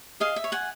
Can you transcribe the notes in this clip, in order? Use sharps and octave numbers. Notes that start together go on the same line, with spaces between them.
G#4 D#5 F5
E5
C#5
F#5 G#5